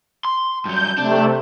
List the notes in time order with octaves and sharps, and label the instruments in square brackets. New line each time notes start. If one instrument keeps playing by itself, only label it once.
[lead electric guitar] C6
[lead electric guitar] G2 F#3 [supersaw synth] G6
[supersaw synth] C3 A3 [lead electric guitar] D4